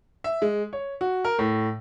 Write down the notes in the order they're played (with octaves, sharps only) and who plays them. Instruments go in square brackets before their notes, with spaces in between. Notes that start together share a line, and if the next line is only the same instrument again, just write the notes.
[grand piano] E5
G#3
C#5
F#4
A#4
A2